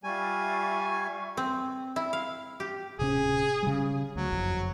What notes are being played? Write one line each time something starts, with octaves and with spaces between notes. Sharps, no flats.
G3 F4 E5 G#5 C#6
C4
E4
F5
G4
D1 C3 C#4 G#4
C#3 G3
D2 F#3
F#1 F2